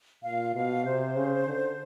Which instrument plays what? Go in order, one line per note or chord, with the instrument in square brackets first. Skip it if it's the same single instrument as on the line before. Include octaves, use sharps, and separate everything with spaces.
[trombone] A#2 [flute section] F5
[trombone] B2 [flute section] F5
[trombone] C3 [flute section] C5
[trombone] C#3
D3